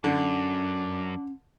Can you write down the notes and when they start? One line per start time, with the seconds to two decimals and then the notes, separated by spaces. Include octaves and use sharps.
0.04 F#2 D3 C#4 D4